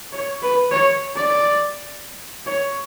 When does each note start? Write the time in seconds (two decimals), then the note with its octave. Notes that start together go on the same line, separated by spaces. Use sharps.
0.12 C#5
0.42 B4
0.71 C#5
1.16 D5
2.46 C#5